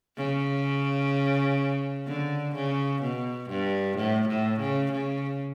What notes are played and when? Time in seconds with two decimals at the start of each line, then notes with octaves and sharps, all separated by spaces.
0.17 C#3
2.07 D3
2.54 C#3
3.02 B2
3.49 G2
3.97 A2
4.28 A2
4.60 C#3
4.91 C#3